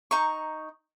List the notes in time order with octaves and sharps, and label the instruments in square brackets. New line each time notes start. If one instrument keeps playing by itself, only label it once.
[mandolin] D#4 A#5 C#6